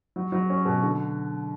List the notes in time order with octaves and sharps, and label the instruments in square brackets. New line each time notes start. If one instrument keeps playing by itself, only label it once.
[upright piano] F#3
F#3
C#4
B2
D3